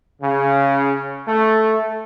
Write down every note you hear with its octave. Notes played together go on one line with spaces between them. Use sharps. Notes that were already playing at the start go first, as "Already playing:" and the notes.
C#3
A3